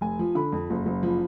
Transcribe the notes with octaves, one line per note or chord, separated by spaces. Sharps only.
F1 G#5
F3
D3 B5
F2
F#1
F#1
F3